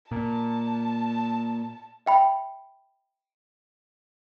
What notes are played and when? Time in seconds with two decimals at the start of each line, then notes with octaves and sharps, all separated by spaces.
0.11 A#2 A5
2.06 E5 G5 B5